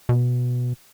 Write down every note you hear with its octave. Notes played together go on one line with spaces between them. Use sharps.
B2